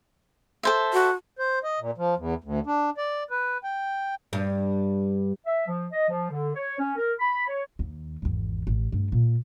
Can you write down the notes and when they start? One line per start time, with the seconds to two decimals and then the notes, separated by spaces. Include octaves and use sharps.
0.63 A4 C5 E5
0.93 F#4
1.39 C5
1.64 D#5
1.80 A#2
1.98 F3
2.17 E2
2.44 D2
2.67 D4
2.98 D5
3.31 B4
3.64 G5
4.33 G2
5.46 E5
5.67 F3
5.91 D#5
6.09 F3
6.31 D3
6.55 C#5
6.79 C#4
6.97 A#4
7.19 B5
7.48 C#5
7.79 D#2
8.22 G#1 E2
8.67 A1
8.92 G2 A3
9.12 A#2